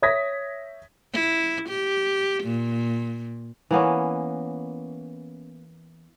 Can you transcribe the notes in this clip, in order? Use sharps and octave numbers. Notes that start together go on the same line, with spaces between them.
C#5 E5 D#6 G#6 A#6 B6
E4
G4
A#2
E3 A#3 B3 C#4